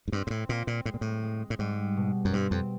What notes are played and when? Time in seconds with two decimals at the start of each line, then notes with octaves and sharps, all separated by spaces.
0.08 G#2
0.12 G2 C4
0.27 G#2
0.30 A2
0.49 A#2 C4
0.67 A#2
0.85 A2 G#3
0.94 A#2
1.01 A2
1.23 G#3
1.50 A2
1.59 G#2 G3
1.97 B2
2.25 F#2
2.33 G2 C4
2.51 F2